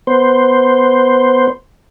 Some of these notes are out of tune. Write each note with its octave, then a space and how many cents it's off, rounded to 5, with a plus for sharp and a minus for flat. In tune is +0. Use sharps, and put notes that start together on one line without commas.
B3 +0 C5 +0